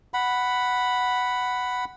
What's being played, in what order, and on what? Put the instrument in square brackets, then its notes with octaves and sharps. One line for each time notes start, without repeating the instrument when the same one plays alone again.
[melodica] F#5 B5